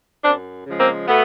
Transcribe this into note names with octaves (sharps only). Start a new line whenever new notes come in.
F#2 C4 D4
C#3 F3 G#3
A#3 C4
B2 A3 B3